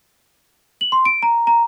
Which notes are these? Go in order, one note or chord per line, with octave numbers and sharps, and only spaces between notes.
F#7
C6
D7
A#5
A#5